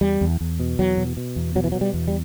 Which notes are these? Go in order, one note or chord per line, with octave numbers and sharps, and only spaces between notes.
E2 G3
E2
E2
B2
E2 F#3
B2
B2
E2
B2 F#3
E3
F#3
B2
G3
E2
G3